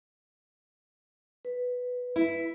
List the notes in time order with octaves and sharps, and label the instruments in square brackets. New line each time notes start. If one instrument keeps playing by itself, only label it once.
[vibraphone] B4
[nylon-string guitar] E4